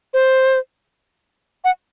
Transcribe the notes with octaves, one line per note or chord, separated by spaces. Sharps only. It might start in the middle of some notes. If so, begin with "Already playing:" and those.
C5
F#5